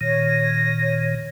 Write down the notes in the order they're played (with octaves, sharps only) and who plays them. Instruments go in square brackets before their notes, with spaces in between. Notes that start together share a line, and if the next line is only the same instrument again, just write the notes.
[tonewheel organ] A#2 D#3 [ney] C#5 [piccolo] A#6